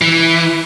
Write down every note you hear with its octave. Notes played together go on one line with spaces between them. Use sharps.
E3